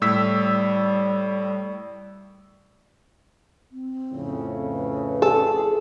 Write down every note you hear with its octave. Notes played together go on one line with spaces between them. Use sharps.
A2 G3 E6 B6
C4
F2 A2 C#3
B4
G#4 A4